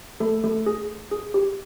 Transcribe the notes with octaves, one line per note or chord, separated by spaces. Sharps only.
A3 A4
A3 A4
G#4
G#4
G4